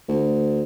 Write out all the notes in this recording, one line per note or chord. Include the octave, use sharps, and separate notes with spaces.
D2